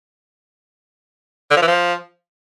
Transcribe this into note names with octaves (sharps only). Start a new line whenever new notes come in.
D3
F3
E3
F3